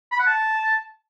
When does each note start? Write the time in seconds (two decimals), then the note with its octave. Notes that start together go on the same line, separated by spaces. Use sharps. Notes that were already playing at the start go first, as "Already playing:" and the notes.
0.11 B5
0.19 F#5
0.27 A5